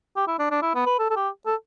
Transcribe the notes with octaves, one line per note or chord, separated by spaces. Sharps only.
G4
E4
D4
D4
E4
B3
B4
A4
A4
G4
A4